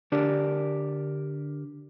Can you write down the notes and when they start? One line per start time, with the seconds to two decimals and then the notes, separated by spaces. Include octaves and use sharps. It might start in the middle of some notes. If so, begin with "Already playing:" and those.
0.12 D3 D4 G4 A#4 D5